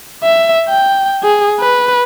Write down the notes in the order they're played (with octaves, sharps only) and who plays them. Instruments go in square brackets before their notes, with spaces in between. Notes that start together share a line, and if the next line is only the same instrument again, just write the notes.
[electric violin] E5
G5
G#4
B4